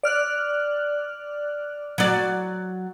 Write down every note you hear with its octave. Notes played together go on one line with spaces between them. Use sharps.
D5 F6 F#6
F#3 D5